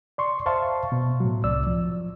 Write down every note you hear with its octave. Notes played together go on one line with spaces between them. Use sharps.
D5 C6 C#6
C5 E5 F5 A5 C6 C#6
B2
A2 F#3
C2 C3 D5 E6
F3